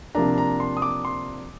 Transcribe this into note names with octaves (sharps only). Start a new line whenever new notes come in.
C3 F3 A#3 D4 A#5
A#5
C6
D#6
D6
C6